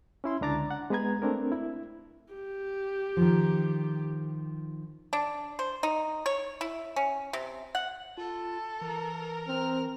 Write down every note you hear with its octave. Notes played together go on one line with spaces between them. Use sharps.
C#4 E4 C6
C#2 D3 D4 A#5 D6 A6
F#5
G#3 B3 G#4 B4 A#5 G#6
A3 C4 D4 A#4
E4
G4
D#3 F3
D4
C5
D#4
C#5
E4
C#4
C3
F#5
F4 A4
E3 A#4
C4 F6